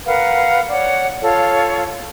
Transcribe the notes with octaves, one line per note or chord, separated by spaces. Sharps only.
A#4 B4 F5 F#5
C#5 D5 F#5
F4 A4 C#5 F5